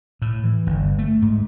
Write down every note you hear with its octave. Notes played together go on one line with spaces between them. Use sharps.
A2
E3
G1
A3
G#2